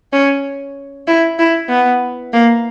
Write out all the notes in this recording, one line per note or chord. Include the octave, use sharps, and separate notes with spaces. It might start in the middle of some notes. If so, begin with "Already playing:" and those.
C#4
E4
E4
B3
A#3